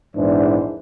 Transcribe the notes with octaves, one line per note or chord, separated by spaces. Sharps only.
A#1 E2 G#2 E3 D4 C5